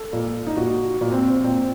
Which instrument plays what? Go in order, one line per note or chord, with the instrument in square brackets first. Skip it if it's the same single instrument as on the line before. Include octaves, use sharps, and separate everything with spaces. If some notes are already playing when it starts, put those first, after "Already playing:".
Already playing: [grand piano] A4
A#2
D#4
A#2 F#4
A#2
C4
C4
A#2 C4